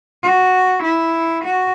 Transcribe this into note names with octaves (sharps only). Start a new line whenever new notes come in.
F#4
E4
F#4